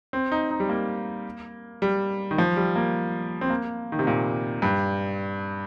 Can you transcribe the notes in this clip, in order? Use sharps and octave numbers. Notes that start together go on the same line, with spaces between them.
C4
D#4
D#4
G3
A#3
G3
D#3
F3
G3
A#3
C4
A#3
D#3
C3
A#2
G2